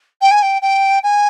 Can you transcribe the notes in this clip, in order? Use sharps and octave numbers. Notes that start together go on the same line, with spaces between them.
G5
G#5
G5
G5
G#5